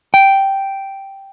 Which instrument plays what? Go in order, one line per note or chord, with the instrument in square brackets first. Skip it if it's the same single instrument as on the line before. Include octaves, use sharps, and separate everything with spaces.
[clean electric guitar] G5